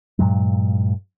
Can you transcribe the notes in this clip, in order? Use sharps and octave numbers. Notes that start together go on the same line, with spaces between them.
G2 A#2 F#3 G#3